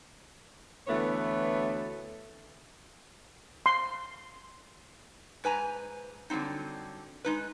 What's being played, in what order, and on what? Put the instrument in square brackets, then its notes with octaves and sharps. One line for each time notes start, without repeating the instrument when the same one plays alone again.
[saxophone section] D2 E3 A3 B3 C#5
[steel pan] C6
[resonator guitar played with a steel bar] G#2 B4 G#5 A#5
D3 F#3 G3 C4 D#4
G#3 D#4 B4